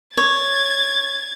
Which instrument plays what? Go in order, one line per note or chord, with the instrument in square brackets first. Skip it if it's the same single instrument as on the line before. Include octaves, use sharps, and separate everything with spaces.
[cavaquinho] C#5 [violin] G#6 A6